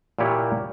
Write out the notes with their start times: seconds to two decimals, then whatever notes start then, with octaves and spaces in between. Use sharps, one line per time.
0.19 A#2 A#3 E4 G4 C#5